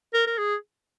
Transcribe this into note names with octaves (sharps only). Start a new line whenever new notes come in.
A#4
A#4
G#4